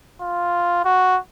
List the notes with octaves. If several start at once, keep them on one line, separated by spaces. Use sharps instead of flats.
F4
F#4